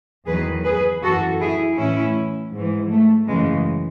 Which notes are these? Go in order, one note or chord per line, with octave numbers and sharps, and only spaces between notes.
E2 D#3 F#3 G#4 B4
G#4 B4
F#2 E3 F#4 A4
E4 G#4
A2 E3 C#4 E4
G#2 E3
A3
F#2 C#3 E3 G#3